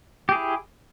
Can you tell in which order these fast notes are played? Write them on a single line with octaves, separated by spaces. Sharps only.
G4 G#4 E4